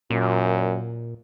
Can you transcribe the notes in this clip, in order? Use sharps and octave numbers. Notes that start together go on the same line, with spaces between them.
F#2 A#2